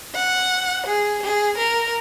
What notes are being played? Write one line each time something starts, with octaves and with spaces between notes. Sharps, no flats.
F#5
G#4
G#4
A#4